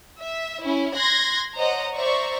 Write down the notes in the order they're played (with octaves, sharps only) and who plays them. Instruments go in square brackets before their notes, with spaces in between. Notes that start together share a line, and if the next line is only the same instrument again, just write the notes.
[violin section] E5
C#4 E4
C6 F#6 G#6 A#6
C5 C#5 D#5 F#5 A#5
C5 D5 E5 A#5 C#6